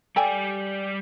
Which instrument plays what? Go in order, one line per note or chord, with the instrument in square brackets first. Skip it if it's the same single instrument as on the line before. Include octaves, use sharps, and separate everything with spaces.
[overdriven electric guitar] G3 D5 [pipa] A4 G5 G#5